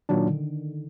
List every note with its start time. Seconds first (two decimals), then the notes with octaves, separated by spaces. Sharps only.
0.09 A#2 D#3 F#3 D4
0.27 D3